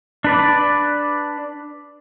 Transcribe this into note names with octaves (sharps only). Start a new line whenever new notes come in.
D4 B4 D5